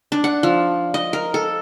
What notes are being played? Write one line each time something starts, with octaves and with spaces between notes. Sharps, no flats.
D4
F#5
F3
D#5
A#4
A4